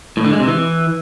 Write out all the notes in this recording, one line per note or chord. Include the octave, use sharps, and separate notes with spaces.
A2
D3
G#3
C3
E3